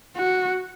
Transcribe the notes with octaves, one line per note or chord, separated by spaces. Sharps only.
F#4